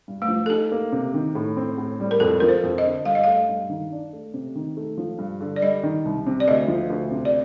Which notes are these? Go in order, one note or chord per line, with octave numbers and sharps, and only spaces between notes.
G2
A3
F3
A4
D#4 G4
A#3
C3
D#3
A2
C4
A2
G3
A#4
F2 A4
F3 A#4
C5
F2
D#5
D3
G2 F5
D#5
A3 F5
G2
D#3
D4
A3
C3
D#3
A3
F3
G2
D3
D5
G3 D#5
D#3
C2
C3
D5
D2 D#5
F3
D2
C3
D5